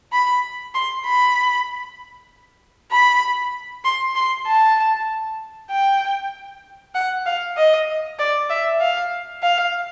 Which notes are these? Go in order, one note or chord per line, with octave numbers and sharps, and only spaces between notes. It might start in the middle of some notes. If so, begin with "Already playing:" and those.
B5
C6
B5
B5
C6
C6
A5
G5
F#5
F5
D#5
D5
E5
F5
F5